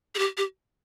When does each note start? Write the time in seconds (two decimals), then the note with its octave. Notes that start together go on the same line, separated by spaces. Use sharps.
0.15 G#4
0.19 G4
0.37 G4